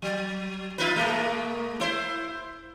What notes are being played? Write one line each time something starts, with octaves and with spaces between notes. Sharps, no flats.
F#3
D#4 F4 B4
B2 G#3 A#3
E4 C5